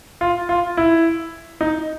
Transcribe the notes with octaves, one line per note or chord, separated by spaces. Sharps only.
F4
F4
E4
D#4